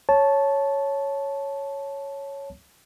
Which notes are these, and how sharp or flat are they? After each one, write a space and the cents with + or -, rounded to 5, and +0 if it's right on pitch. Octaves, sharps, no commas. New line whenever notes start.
C#5 +0 A5 -10